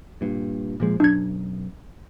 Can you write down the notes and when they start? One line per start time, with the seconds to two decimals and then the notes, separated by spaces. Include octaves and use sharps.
0.21 G2 A#2
0.80 A#2 F3 G#3
1.00 B1 F#2 D4 G#6